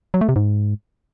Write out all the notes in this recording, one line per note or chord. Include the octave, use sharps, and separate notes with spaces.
F#3
A3
C3
G#2